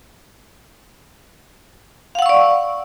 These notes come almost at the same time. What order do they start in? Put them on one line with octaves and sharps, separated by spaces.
F5 F#5 E6 C#6 D5